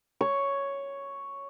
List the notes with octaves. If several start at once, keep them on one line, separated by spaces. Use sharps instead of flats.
C#5